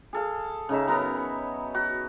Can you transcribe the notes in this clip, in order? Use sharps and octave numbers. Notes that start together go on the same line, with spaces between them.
G#4 A4 F5
C#3 D#4 C#5 E5
F#3 B3 A#4 A#5
B5
F#4